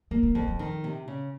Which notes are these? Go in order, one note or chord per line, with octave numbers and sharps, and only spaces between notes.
D#3 A#3
C#3
F2 D#3
F3
D#3
C3
C#3